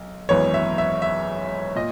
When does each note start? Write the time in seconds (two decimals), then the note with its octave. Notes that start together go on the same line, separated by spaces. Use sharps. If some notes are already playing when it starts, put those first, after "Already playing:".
Already playing: B1
0.29 G#1 F#2 E3 B3 C#5
0.54 E5
0.78 E5
1.02 E5
1.76 A#2 D#5